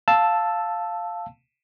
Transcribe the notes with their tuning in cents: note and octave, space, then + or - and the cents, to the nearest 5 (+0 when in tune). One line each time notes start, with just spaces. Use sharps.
F5 +0 A5 +0 E6 +0